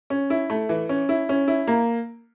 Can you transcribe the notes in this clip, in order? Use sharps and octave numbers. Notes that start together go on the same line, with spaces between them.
C#4
E4
A3
E3
C#4
E4
C#4
E4
A#3